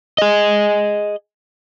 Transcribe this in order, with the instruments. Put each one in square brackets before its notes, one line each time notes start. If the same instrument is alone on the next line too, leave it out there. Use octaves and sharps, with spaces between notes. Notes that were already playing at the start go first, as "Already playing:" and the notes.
[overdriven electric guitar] G#4 D#5